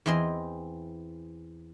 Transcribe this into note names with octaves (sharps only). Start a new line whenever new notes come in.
E2 E3 C4 D#5 C6